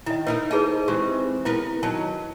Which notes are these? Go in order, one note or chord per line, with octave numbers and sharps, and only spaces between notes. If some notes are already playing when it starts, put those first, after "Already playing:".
D#3 E4 D#5
D#4 E4 A#4 B4
D#4 G#4 B4 C5 D#5
E3 G#3 C4 G4
B3 E4 A#4 B4
D#3 F#3 A5